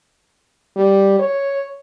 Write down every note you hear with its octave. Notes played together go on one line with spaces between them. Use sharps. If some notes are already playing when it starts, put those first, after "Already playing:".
G3
C#5